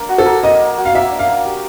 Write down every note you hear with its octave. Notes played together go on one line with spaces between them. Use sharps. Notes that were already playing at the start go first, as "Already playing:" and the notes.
Already playing: A#3 D4
F#4
A4
A#3
A#3 D#5
A#3
F#4
F5
A#3 E5
D4
F5
A#3
G4